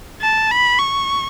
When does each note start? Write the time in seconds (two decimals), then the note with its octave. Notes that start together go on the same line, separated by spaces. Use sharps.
0.21 A5
0.51 B5
0.79 C#6